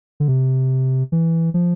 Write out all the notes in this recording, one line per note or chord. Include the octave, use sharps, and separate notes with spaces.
D3
C3
E3
F3